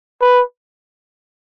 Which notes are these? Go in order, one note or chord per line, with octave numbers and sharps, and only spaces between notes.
B4